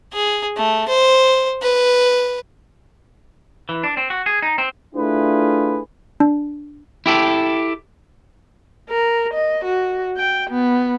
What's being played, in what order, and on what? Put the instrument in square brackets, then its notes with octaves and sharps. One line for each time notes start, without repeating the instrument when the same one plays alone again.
[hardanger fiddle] G#4
A3
C5
B4
[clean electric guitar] E3
D4
C4
F#4
G#4
D#4
C4
[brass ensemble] A3 D4 E4 F4 G#4 B4
[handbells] D4
[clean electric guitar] E4 G4 A4
[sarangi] A#4
D#5
F#4
G5
B3